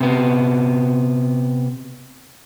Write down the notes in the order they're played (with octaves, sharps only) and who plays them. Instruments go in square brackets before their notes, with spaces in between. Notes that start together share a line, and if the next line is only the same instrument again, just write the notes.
[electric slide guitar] C3 B3